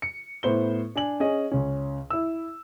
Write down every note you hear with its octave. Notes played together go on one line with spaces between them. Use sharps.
C#7
A2 B3 C5 G7
D4 G#5 F#7
C#4 G#4 D#5
C#2 C#4
E4 E6